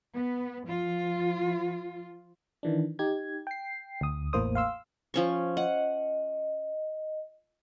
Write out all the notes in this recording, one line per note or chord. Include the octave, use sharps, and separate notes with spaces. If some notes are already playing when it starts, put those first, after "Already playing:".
B3
F3 F4
D#3 E3 D4
D#4 G4 G#6
G5 C7
D2 D#6
A1 E2 A2 A#3 C5 D#6
F5 C6 E6
F3 C#4 C#6
D#5 F#5